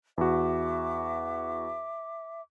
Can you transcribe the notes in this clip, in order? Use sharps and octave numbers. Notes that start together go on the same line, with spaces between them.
E2 F#4 E5 D6